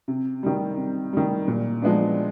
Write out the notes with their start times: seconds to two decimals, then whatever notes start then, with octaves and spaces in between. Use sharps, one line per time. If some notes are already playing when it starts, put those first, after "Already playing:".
0.08 C3
0.43 D#3 G3
0.77 C3
1.13 D#3 G3
1.48 A#2
1.82 F3 G#3 B3 D4